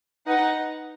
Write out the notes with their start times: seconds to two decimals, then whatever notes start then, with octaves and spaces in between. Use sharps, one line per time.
0.27 D#4 B4 F#5